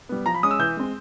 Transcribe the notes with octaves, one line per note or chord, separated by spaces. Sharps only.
G3 B3
F3 A#5
B5
G#3 C#4 D#6
E6
E3 G6
G#3 C4